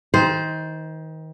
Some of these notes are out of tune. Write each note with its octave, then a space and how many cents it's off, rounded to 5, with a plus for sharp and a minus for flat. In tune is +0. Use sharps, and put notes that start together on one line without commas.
D#3 +30 C5 +0